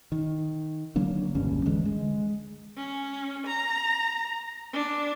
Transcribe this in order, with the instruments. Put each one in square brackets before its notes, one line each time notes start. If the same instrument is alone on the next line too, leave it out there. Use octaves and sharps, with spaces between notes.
[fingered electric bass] D#3
D3 F#3 A#3 D4
E1 C#2 G2 C#4
D3 E3 G#3
G#3
[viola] C#4
A#5
D4